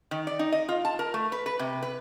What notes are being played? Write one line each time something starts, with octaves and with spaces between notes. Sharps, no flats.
D#3
D5
D#4
D#5
F4
A5
A#4
A3
B4
B4
C3
B4